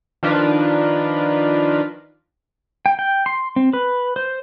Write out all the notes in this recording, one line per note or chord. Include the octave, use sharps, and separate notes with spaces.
D#3 F3 D4 F4 A#4 B4
G5
G5
C6
C4
B4
C5